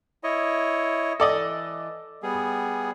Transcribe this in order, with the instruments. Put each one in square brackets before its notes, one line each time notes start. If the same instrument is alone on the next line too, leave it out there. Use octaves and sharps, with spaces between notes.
[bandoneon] E4 C#5 D#5
[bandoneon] E3 [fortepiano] A4 D5 D#5
[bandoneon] G3 B3 G#4